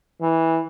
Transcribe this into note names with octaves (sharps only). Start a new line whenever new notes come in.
E3